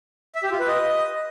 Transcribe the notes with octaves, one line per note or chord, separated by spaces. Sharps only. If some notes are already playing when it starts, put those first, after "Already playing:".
E5
G4
F4
B4
D#5